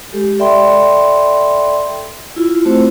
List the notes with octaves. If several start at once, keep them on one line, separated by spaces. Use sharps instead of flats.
G#3 G4 A4
A4 D5 E5 G5 B5 C6
E4 F4
A3 C4 E4 F#4 C5